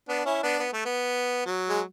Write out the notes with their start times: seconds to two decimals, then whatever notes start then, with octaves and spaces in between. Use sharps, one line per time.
0.09 B3 D4
0.25 C#4 E4
0.43 B3 D4
0.60 B3
0.73 A3
0.85 B3
1.46 F#3
1.69 G#3